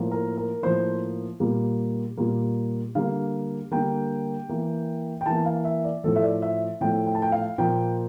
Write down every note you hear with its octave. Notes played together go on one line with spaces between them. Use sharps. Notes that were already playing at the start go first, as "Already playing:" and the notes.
Already playing: A2 F3 A#3
A#4
A#4
A2 F3 A#3 C5
A#2 G3 A#3
A#2 G3 A#3
D3 G3 A#3 F5
D3 G3 A#3 G5
E3 A#3
G5
E3 A#3 A5
F5
E5
D5
A2 F3 A3 A4
E5
D5
E5
A2 F3 A3 G5
G5
A5
G5
F5
A#2 F3 A#3 G5